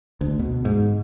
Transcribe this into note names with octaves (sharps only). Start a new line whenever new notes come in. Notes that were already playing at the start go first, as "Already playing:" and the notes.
D2
B2
G#2